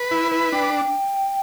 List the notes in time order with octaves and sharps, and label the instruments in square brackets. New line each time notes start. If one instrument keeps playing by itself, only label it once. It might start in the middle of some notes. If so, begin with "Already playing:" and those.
Already playing: [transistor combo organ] B4
[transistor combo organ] E4 [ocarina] B5
[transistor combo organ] B4
[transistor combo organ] D4 [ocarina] G5